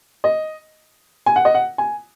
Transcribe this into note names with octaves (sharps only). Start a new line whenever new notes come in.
D#5
G#5
F#5
D#5
F#5
G#5